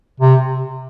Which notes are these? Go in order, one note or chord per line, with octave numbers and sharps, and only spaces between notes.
C3